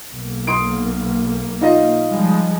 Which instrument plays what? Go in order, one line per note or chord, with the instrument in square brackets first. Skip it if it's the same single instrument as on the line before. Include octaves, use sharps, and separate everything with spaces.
[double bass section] B1 A#3
[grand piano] C6 D#6 D7
D#4 F4 D#5
[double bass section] F3 G3 G#3